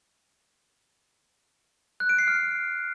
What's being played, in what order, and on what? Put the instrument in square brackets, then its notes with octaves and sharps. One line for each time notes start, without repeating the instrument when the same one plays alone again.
[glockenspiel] F#6
D7
C7
F6